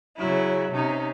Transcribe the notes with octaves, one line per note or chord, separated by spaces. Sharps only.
C#3 F#3 E4
C3 C#4 D#4